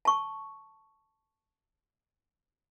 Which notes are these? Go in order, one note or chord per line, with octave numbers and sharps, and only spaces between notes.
A5 C#6